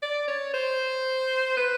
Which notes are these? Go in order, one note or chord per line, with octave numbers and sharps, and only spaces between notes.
D5
C#5
C5
B4